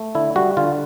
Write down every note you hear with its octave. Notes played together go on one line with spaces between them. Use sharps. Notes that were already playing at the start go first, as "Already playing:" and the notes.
Already playing: A3
D3 E4
G3 F#4
D3 F4